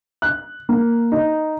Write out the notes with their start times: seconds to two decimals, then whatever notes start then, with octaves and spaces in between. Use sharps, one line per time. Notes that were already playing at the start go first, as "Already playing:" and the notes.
0.22 F#6
0.69 A#3
1.12 D#4